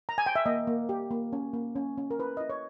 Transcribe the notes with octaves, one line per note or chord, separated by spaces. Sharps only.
A#5
G#5
G5
E5
A#3 D#5
A#3
G4
A#3
C#4
A#3
C#4
C#4
A#4
E4 B4
E4 D#5
C#5